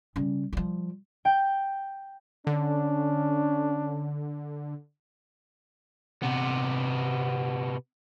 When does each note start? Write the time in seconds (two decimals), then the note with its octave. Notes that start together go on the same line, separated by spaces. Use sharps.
0.16 C#3 G3
0.53 F3 G3
1.25 G5
2.47 D3 C#4 D4
6.23 C3 B3